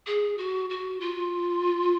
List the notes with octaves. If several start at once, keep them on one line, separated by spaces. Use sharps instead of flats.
G#4
F#4
F#4
F4